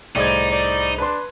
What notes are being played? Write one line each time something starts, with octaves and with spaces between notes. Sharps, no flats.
C2 A2 D#4 G#4 C5 D5 D#5 G#6
D5
D4 B4 C6